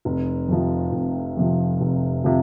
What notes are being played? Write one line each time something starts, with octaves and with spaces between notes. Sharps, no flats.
F1
F2 C3 F3
F1
F2 C3 F3
F1
C3 F3